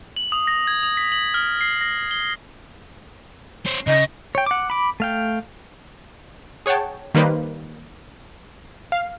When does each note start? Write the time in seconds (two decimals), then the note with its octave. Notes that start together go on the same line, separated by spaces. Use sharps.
0.16 F#7
0.32 D#6
0.47 A#6
0.67 G#6
0.83 D#6
0.97 B6
1.12 F#7
1.34 F6
1.61 C7
1.81 A#6
2.11 G7
3.66 C#4 C5
3.87 C#3 D#5
4.35 C#5 G5
4.46 F#5 D6
4.70 B5 D6
5.00 A3 F5 G5
6.66 G#4 C#5 F#5 G5 A5
7.15 D#3 G3 A#3 D#4 B4 C5
8.92 F5